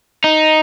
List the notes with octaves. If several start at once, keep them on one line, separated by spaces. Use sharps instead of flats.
D#4